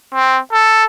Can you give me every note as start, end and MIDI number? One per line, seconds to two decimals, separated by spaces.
0.14 0.39 60
0.53 0.84 69